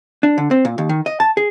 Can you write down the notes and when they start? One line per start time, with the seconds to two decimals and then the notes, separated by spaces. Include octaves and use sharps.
0.23 D4
0.38 D3
0.51 C4
0.65 A#2
0.78 D#2
0.89 D#3
1.06 D#5
1.20 A5
1.37 G#4